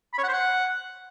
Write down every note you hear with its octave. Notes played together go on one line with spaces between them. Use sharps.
B5
C#5
F#5
C5
F#5